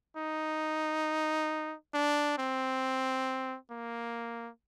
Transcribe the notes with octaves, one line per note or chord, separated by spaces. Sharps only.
D#4
D4
C4
A#3